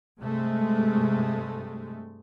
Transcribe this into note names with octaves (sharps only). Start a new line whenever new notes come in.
G2 C3 G#3 A3